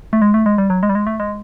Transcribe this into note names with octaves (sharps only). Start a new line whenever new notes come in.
A3
G#3
A3
G#3
G3
F#3
G#3
G3
G#3
A3
G#3